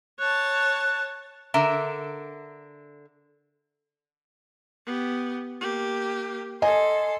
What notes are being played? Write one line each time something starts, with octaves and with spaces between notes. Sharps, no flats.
C#5 A5 F#6
D3 A#4 E5
B3 G4
A#3 G4
A4 D#5 G#5 C6